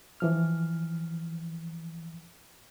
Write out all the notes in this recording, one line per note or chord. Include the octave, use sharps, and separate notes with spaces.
E3 F3 F6